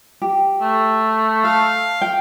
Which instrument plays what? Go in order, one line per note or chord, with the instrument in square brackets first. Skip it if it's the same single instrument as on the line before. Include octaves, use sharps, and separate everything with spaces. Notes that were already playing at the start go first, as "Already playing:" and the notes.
[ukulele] G4
[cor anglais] A3
[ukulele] A4 [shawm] F5
[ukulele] G5